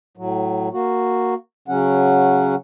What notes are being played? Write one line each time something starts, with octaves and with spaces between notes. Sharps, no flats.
A2 F#3
A#3 F#4
C#3 F#3 C#4 F#5